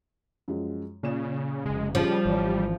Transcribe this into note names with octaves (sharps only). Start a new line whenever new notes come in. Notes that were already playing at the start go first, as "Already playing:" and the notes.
F#2 F3 G#3
A#2 C#3 D5 E7
F1 C#3 G#3
F3 G3 C#4 G#4
G#1 E3 C#5 D5